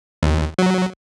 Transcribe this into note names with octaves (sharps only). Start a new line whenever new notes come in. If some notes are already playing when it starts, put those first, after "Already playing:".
D#2
F#3